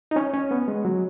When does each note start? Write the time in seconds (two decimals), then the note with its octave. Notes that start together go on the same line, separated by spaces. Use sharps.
0.11 D#4
0.16 C#4
0.34 C#4
0.51 B3
0.68 G#3
0.85 F#3